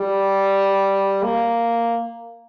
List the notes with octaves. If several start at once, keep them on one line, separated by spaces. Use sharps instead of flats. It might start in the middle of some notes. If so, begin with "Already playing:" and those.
Already playing: G3
A#3